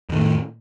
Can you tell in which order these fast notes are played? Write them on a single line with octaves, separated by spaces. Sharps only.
F2 D#3 A2